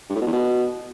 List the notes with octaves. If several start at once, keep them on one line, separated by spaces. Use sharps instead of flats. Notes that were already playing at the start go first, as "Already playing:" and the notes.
G2
A2
B2
E2
B2